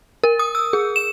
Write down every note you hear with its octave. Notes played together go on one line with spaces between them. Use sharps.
A#4
D#6
E6
G#4
E7